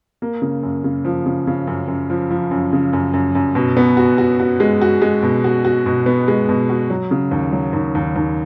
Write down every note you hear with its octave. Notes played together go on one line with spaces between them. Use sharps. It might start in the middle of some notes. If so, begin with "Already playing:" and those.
A#3
C#3
F#2
C#3
F3
C#3
C#3
F#2
F#2
F3
F3
F#2
C#3
F#2
F#2
F#2
B2
B3
F#4
F#4
F#4
G#3
F#4
G#3
B2
F#4
F#4
B2
B3
G#3
B2
F#4
F#3
C#3
D#2
F#3
D#2
D#2
D#2